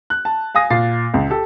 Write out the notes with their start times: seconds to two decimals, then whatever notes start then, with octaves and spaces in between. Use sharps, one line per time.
0.10 F#6
0.25 A5
0.55 F5 G#5 D#6 A#6
0.70 A#2 F5 A6 C7
1.14 C#2
1.30 G4 A4